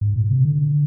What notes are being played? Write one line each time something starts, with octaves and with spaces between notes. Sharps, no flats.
G#2
A#2
C3
D3